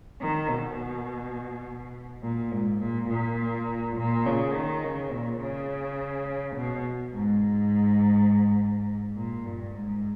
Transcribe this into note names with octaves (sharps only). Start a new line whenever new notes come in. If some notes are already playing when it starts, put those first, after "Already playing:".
D#3
B2
A#2
G#2
A#2
A#2
A#2
C#3
D#3
C#3
A#2
C#3
B2
G#2
A#2
G2
G#2